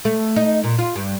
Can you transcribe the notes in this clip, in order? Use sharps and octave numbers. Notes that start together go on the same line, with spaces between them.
A3
D#4
A#2
F4
G2